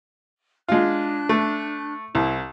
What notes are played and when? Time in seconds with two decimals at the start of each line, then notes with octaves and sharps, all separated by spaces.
0.68 G#3 D4 F4 F#6
1.29 A3
2.15 C2 E4